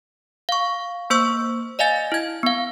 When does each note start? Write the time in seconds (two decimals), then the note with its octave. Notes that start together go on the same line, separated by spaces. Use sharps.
0.49 F5 C#6
1.10 A#3 C5 C#6 E6
1.79 D5 D#5 F5 G#5 A6
2.12 E4 G#6
2.43 B3 F5